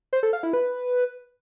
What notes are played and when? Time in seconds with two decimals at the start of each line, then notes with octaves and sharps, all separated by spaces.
0.13 C5
0.23 A4
0.33 F5
0.43 E4
0.53 B4